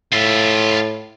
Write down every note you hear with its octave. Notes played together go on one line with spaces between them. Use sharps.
A2 F4 E5